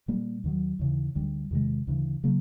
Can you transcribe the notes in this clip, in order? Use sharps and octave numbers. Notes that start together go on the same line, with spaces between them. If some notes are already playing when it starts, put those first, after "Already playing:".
A#2 G3 A#3
D#2 D#3 F#3
D#2 C#3 E3
D2 D3 G3
E2 C3 D#3 G#3
D2 C#3 E3
C#3 F#3 A#3